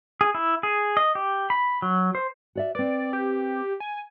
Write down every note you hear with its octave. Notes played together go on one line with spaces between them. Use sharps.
G#4
E4
G#4
D#5
G4
B5
F#3
C5
F#4 D5 E5
C4 B4 D5
G4
G#5